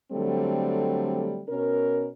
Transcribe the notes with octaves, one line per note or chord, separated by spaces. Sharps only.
D3 F#3 G3 A3 C4
B2 C#4 A#4